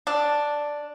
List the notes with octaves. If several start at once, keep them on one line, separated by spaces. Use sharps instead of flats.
D4